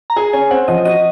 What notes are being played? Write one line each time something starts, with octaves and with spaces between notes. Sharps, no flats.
A#5
G#4 G#5
C#4 G#5
C4 F#5
F3 D#5
F#4 D#5